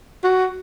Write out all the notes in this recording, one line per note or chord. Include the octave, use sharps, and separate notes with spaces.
F#4